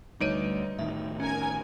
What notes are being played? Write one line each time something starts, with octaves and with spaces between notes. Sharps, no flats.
D2 G3 D#4 B4 C#5 D7 D#7
A2 D#3 E5
C#4 A#4 G#5 G#6